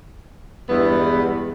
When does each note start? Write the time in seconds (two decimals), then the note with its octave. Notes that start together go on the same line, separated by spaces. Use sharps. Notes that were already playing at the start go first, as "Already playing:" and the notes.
0.68 E2 G2 G#3 B3